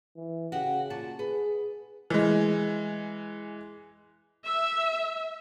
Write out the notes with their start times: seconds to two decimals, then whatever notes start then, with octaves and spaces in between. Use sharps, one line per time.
0.16 E3
0.52 C#3 F#4 G4
0.90 A#2 F#4 A5
1.19 G#4 B4
2.10 E3 G#3
4.44 E5